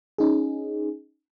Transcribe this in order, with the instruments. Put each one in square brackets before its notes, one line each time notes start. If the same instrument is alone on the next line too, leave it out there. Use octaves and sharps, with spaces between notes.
[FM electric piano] C#4 D#4 G#4